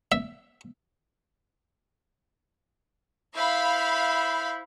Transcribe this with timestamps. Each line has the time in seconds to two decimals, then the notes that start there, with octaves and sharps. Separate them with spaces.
0.12 E5
3.36 E4 C5 E5 F5 B5